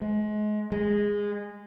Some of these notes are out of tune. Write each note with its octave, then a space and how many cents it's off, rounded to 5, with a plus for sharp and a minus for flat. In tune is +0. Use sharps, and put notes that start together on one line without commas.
G#3 +30
G#3 -15